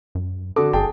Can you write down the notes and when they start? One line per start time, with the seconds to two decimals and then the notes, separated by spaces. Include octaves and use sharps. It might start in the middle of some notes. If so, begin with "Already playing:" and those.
0.15 F#2
0.56 D3 F#4 A4 D6
0.73 G1 G#4 G5 A5